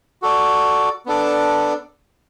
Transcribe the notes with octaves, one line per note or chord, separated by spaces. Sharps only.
F#4 A4 D5
B3 D4 A4 D5